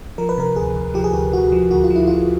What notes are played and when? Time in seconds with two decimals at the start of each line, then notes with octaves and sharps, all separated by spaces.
0.18 F3 A#4
0.29 B4
0.38 C3 A#4
0.56 D2 G#4
0.76 D2
0.94 F3 G4
1.04 G#4
1.13 D2 G4
1.33 D2 F#4
1.52 F3
1.71 D2 F#4
1.84 F4
1.90 F3
1.96 E4
2.07 F3 F4